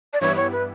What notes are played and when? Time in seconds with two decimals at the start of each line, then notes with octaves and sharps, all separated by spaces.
0.13 D5
0.21 G2 E3 G3 B3 E4 C#5
0.36 C#5
0.52 B4